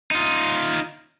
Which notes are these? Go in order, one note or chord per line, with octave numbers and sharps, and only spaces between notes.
D#4 F4